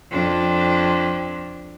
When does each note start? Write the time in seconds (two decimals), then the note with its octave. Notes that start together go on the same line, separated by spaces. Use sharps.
0.12 F2 D4